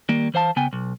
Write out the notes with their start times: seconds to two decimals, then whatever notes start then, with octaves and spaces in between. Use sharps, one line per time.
0.09 D#3 G3 A#3
0.34 E3 C5 F5 A5
0.56 C#3 B3 G5 G#5
0.73 B1